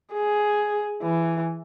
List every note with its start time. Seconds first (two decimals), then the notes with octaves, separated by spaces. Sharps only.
0.13 G#4
1.03 E3